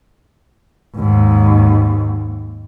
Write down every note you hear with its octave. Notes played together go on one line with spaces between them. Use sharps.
D#2 G#2